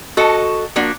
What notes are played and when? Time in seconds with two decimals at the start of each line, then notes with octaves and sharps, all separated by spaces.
0.17 F#4 A4 D#5
0.76 F3 A#3 D4 F#4